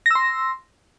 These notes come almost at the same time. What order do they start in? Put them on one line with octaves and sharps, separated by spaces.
A#6 E6 C6